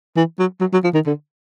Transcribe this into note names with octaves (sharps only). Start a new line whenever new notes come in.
E3
F#3
F#3
F#3
F3
D#3
D3